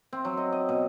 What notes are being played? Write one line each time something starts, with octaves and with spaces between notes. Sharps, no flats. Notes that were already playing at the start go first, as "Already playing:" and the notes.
C4
F#3
D#5
D#5
B2